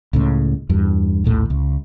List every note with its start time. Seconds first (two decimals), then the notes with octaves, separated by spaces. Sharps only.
0.13 C#2 A2 C#3
0.69 E2 G2
1.24 A#1 D#2 A2
1.50 C#2